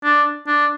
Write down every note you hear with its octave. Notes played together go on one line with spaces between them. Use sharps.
D4
D4